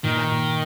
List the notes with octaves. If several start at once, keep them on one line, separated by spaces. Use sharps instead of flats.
A#2 D#3
A#2